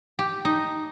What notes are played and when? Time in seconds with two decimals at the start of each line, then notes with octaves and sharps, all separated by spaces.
0.19 G4
0.45 D#4